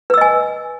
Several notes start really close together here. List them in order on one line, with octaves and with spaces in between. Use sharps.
B4 E6 D#5 G#5